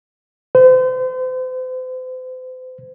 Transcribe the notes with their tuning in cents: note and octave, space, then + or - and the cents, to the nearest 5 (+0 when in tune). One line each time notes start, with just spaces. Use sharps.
C5 -40